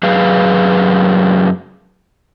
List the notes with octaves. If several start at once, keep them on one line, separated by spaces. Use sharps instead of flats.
F#2 F#3 G#4 B4 F5